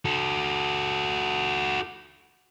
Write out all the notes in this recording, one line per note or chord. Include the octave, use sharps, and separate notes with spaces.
F#4 A4